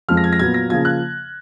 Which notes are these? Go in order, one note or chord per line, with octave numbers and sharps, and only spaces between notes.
F2 F3 G#3 F6
A#6
G#6
A#6
A#2 F#3 B3 G#6
A#6
C#3 F3 A#3 G#6
F#6